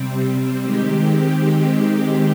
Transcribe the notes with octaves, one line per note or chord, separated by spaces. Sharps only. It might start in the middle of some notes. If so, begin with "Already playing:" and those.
Already playing: C3 G3 C4
D#3 G#3 C4 G4
D#3 G#3 C4 G4